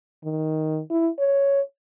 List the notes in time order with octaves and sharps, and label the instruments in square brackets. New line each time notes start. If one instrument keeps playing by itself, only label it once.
[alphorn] D#3
E4
C#5